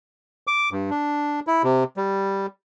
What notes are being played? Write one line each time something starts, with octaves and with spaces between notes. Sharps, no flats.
D6
G2
D4
E4
C3
G3